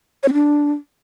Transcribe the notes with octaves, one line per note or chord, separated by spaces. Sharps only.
C#5
C4
D4